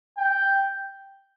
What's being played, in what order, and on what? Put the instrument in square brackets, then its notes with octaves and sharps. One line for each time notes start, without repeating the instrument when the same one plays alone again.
[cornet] G5